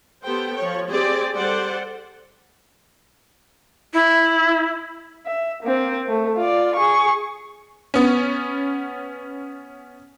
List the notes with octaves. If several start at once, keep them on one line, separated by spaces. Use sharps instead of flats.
B3 G4 A4 C5 G5
F3 C#5
C4 G4 G#4 C5 D5
G3 A4 C5 D5 F#5
E4
E5
A#3 C4
A3
F4 D5
G#4 C#6
B3 C#4